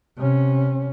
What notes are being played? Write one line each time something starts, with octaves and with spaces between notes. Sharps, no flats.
C3 C#4